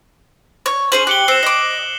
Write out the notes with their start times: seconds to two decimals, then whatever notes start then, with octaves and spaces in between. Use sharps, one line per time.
0.66 C#5
0.92 C#4 G#4 C5 F#7
1.07 G4 F#6 C#7 G7
1.28 C4 C7 E7
1.43 D#5 D6